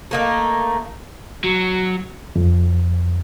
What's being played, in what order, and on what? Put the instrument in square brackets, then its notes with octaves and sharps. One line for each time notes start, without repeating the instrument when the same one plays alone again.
[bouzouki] A3 A#3 D#4
[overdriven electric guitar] F#3
[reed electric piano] F2